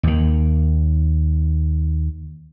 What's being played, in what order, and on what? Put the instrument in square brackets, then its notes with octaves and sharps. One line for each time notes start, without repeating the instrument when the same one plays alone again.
[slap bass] D#2 D#3